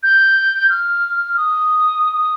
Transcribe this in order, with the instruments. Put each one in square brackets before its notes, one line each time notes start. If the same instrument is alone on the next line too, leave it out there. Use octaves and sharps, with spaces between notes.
[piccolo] G6
F6
D#6